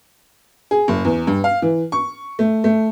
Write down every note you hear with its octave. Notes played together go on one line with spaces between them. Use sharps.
G#4
F#1
E2
G2
F5
E3
C#6
A3
A3